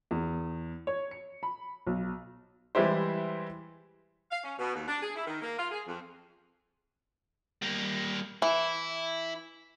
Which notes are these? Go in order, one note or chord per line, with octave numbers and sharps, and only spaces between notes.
E2
C#5
C#7
B5
B1
E3 G3 G#3 E4 G4 C5
F5
C#4
B2
D#2
D4
G#4
E4
D#3
A#3
F4
G#4
F2
G3 A#3
E3 E4